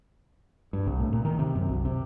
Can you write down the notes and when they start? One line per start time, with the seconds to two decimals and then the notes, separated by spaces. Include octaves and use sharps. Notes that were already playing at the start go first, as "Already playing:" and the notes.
0.73 G2
0.87 C2
0.99 A2
1.13 A#2
1.25 D#3
1.39 C3
1.55 F#2
1.69 C2
1.85 C3